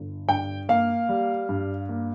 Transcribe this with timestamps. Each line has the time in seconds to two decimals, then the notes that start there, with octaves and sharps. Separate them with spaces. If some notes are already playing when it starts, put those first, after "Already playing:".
Already playing: G1
0.28 G2 G5
0.69 A#3 F5
1.09 G3
1.49 G2
1.89 A#3